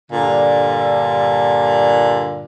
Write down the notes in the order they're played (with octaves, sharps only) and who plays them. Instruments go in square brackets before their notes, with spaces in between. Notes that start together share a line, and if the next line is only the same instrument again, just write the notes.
[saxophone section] G2 A#2 D3